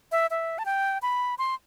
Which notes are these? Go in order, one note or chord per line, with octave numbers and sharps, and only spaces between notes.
E5
E5
A5
G5
B5
C6